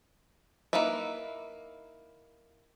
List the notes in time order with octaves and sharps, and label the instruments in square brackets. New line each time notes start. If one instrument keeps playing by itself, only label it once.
[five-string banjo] A#3 D#4 E4 B4 E5